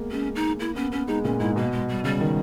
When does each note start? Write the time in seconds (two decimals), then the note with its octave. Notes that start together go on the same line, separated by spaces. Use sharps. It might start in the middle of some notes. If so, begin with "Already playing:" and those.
Already playing: G#3 A#3 B3
0.11 G#3 C#4
0.36 D#4
0.60 A#3 E4
0.76 B3 C#4
0.92 B3 C#4
1.08 G#3 D#4
1.25 A#2 C#4
1.40 G#2 E4
1.56 B2 A#3
1.72 G#3
1.89 G3
2.04 C#3 G3
2.20 D#3